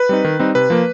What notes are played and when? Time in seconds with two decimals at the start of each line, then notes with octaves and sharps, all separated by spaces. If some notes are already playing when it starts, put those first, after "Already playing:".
Already playing: B4
0.09 G3 C4 D#4
0.24 D#3
0.39 G3 C4 D#4
0.55 C3 B4
0.70 F3 A#3